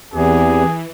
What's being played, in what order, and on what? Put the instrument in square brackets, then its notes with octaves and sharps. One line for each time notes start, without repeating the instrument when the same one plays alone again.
[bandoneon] E2 [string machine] E3 [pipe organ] C4 G4 B4 [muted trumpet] G#4